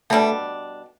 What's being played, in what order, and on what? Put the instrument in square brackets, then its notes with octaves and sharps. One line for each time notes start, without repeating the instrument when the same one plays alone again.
[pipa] B2 G3 D4 [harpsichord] A3